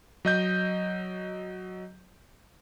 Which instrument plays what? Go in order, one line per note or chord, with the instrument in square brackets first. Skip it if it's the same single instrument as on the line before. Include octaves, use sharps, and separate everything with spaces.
[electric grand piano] F#3 D#5 G6